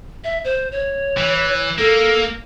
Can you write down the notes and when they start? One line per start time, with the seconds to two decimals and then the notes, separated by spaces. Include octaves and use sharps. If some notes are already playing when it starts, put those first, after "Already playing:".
0.24 E5
0.44 C5
0.72 C#5
1.17 E3
1.78 A#3 A4